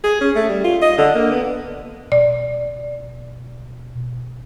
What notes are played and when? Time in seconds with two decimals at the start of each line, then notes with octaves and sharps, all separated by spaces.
0.04 G#4
0.21 C#4
0.36 A3
0.49 G3
0.64 F4
0.82 D#5
0.98 D3
1.15 A#3
1.31 B3
2.12 B2 D5